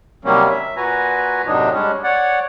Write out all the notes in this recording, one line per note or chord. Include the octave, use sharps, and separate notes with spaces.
C3 D#3 F#3 G3 A#3 C#4
E5
A#2 F#4 B4 G#5 A#5
F#2 A2 C3 F#3 D4 D#4
G3 G#3 C#4 D4
C#5 D5 F#5